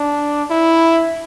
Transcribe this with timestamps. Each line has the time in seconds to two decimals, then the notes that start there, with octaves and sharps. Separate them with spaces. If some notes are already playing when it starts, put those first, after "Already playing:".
Already playing: D4
0.50 E4